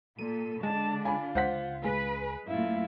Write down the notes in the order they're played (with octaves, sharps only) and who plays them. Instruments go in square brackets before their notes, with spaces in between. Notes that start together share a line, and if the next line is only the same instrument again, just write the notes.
[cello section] A#2 [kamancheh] A4 [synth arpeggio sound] D#7
[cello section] D3 D4 [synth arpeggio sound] G#3 [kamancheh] A5
[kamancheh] F4 [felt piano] G#5 B5
[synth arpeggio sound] C#2 [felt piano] C5 F#5 B6
[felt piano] G#3 [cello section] B4
[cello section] F#2 A#2 A3 [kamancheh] E4 F5